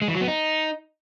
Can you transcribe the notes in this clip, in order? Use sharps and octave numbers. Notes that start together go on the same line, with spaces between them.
G#3
E3
F#3
B3
D#4